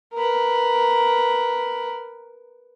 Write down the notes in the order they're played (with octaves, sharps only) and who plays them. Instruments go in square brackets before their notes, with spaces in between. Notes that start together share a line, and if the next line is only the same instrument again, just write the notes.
[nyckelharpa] A#4 B4